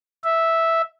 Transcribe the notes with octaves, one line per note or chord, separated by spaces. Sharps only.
E5